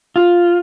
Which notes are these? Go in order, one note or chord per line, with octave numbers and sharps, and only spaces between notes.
F4